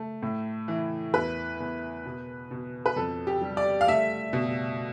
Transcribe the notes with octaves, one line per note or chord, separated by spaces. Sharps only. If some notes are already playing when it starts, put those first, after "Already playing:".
Already playing: A3
A2
E3
E2 B4
E2
B2
B2
B4
F2 A4
G4
G3
D5
F5
A3 E5
B2